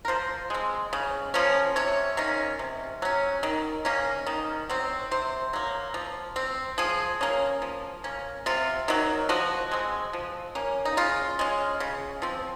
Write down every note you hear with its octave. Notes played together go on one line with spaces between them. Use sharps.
A#4
F3 C5
G#3 C4
C#3
F3 A#3 C#4
C3 C#5
D#3 A#3 C#4
C3
F#3 C#4
D#3
A#3 C#4
D#3
F#3 C4
C3 C5
F#3 A#3
F3
C4
F3 G#4
A#3 C#4
F3
A#3 C#4
C3 F4
D#3 F#3
F3 F#4
G#3 C4
F3
A#3 C#4
D#4
C#3 F4
G#3 C#4
C#3
F3 C4